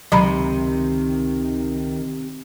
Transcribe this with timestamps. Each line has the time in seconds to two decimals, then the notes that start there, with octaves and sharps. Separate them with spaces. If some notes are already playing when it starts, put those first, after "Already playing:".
0.12 C#2 C3 D#3 F#3 A#5 B5